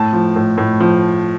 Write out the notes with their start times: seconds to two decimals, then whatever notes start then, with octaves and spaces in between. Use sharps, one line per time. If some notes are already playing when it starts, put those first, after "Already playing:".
Already playing: A2 A5
0.13 F3
0.36 A2
0.58 A2
0.80 F3